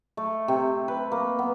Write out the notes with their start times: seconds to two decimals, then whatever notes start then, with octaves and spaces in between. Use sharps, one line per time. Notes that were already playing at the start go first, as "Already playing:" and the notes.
0.17 A3
0.48 C3
0.88 B4
1.12 A#3
1.39 B3